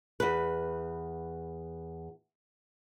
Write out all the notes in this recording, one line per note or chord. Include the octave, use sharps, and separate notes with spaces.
E2 B4